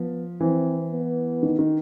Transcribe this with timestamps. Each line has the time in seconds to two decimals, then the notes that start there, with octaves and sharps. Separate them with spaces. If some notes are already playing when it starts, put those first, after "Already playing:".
Already playing: F3 B3
0.41 E3 C4
0.91 B3
1.43 D#3
1.59 D#3